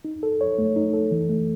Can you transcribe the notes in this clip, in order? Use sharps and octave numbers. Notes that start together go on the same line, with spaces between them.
D#4
A4
C#5
A3
D#4
A4
E3
A3